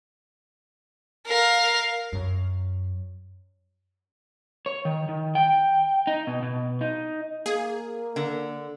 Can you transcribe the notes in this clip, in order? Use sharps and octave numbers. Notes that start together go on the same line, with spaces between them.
A#4 F5
F#2
C#5
D#3
D#3
G5
D#4
B2
B2
D#4
A#3 G#4
D3